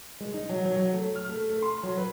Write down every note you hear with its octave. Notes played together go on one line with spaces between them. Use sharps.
G#3
D#4
F#3
F#3
F#3
A3
F6
A3
A3
C6
F#3
B4